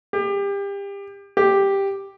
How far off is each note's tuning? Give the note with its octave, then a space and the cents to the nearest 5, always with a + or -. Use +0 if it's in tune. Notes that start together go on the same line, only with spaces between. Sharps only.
G4 +30
G4 +5